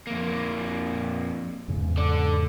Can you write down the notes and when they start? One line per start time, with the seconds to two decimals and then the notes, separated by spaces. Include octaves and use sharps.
0.07 F2 A#3
1.68 E2 G#2 C#3
1.97 A4 D5